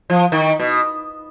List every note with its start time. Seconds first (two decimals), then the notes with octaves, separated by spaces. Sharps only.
0.10 F3
0.32 D#3
0.60 B2